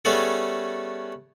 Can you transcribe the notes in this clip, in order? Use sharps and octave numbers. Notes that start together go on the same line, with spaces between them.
G3 A3 B3 C#4 G#4 A4